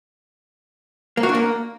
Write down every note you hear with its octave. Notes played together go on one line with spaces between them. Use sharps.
A#3
F#4
D4
A#3